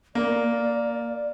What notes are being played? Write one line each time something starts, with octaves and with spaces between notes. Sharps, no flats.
A#3 D5